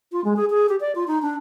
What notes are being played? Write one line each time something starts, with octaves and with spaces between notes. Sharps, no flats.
F4
G#3
G#4
G#4
G4
D5
F4
D#4
D4